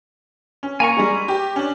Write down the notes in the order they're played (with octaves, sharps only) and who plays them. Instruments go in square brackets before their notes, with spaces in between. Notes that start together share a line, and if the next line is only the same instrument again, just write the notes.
[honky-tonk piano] C#4
[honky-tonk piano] A#3 C#7 [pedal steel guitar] G#5 A#5 C#6
[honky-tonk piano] G3 G#3 G#4
G4
C#4 D4